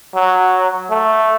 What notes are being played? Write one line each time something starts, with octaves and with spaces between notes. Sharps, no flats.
F#3
A3